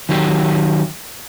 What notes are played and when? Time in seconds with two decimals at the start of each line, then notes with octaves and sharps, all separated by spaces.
0.09 D#3 F#3 G4